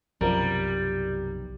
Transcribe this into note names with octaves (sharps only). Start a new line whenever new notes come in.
B1 F#2 C3 F3 G3 A#4